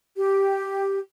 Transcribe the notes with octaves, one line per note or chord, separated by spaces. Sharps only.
G4